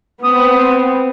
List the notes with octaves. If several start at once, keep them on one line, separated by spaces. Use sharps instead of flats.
B3 C4 D#6